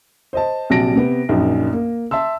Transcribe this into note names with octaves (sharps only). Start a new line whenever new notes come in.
C5 D#5 A5
A#1 C3 F#3 A5 A#6 D7
C3 B3
A#1 F#2 D#4
A#3
E5 A5 C6 E6